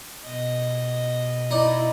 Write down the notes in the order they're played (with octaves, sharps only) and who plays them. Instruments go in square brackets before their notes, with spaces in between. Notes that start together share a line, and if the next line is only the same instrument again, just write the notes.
[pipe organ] B2 [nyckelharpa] D#5
[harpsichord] D#4 D5 [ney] E4